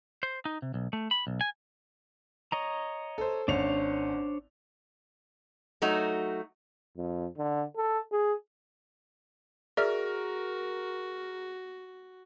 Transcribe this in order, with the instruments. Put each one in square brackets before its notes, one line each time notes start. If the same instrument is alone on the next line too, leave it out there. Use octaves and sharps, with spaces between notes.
[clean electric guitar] C5
D#4
C3
B1
A3
B5
B1
G#5
[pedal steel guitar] C#5 D#5 A#5
[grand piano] A4 C5
[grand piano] G#1 C#4 F7 [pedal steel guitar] D4 C5 C#5
[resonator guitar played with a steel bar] F#3 A3 D#4 F#4
[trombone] F2
D3
A4
G#4
[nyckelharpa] F#4 [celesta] G#4 [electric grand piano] A#4 [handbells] D5 E5 F6